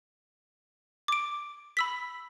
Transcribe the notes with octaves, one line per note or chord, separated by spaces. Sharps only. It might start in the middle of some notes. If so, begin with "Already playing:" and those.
D6 D7
B5 E6 B6